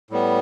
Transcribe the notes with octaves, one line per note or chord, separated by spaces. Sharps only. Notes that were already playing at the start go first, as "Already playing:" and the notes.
A2 G3 B3